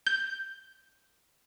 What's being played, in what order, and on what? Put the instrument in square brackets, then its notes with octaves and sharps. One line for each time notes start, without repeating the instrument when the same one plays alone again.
[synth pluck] G6